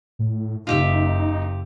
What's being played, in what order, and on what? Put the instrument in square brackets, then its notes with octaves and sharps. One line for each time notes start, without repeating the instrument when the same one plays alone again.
[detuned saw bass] A2
[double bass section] F#1 [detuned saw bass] D#4 [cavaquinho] F4 G4 E5